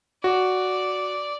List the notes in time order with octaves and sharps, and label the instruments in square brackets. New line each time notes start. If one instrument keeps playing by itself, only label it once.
[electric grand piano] F#4 [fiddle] D5